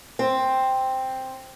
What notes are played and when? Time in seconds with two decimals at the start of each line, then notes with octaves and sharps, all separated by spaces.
0.19 C4